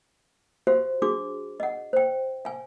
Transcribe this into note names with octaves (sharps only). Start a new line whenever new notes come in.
F#4 G4 C5 F5
D4 F#4 G#4 D6
D#5 F#5
C5 G5
F5 G#5